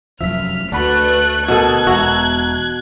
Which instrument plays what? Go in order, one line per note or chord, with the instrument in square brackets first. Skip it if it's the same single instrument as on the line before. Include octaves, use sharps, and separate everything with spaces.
[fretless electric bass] F1 F#2 F3 [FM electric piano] E5 B6 [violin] F6
[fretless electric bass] D2 [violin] A3 F#6 [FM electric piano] D4 F#4 B4
[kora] B2 A4 [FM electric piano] A#4 D#6 [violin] F#6 G#6
[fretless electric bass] E1 [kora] F#4 [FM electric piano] E5 A#5